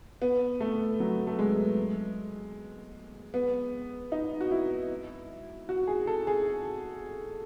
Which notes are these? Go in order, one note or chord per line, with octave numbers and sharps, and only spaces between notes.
B3
A3
F#3
A3
G#3
B3
D#4
F#4
E4
F#4
G#4
A4
G#4